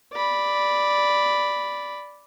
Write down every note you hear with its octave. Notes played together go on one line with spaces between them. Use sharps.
D5 B5